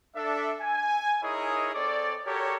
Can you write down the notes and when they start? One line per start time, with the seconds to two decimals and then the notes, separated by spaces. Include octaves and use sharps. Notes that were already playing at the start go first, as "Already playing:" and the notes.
0.16 D4 A4 E5
0.61 G#5
1.22 D#4 E4 G#4 A#4 C#5 D#5
1.74 C4 A4 C#5 D5
2.26 F#4 G4 A4 A#4 C#5